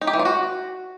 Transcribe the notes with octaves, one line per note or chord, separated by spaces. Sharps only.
D#4
G4
E3
F4
F#4